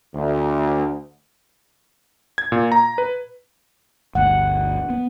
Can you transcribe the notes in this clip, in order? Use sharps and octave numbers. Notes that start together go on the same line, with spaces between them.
D2
G#6
A#2
A#5
B4
G1 D2 F#5
B3